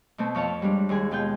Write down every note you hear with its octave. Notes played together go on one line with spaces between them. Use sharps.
B2 A3 C4
F2 C#5 F5 A5
G3 G#3 D4
D#2 G#3 G#4
B2 G#3 F4 G#4 G5 G6